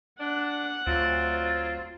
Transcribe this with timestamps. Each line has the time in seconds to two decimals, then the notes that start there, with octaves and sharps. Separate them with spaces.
0.20 D4 F#5
0.87 D2 F#3 C4 F4 A6